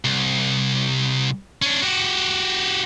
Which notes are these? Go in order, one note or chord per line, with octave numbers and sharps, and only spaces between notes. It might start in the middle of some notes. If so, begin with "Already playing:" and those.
C2
C#4 D4
F#4 G4